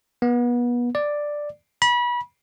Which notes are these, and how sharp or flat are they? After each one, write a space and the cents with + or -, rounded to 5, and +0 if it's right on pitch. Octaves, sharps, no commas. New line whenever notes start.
B3 -30
D5 +5
B5 -30